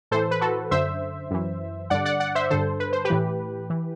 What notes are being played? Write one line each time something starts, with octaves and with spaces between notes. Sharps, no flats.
A2 E3 A4 C5
B4
F#4 A4
F#2 D3 C5 E5
F#2 E3
G2 D3 D5 F#5
D5 F#5
D5 F#5
C5 E5
G2 D3 A4 C5
B4
C5
G4 B4
A2 E3
E3